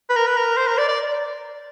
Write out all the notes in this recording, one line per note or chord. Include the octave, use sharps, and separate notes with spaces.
B4
A#4
B4
A#4
C5
A#4
D5
D5